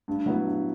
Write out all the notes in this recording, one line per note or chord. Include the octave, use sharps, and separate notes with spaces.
G2
F#3 B3 E4
G2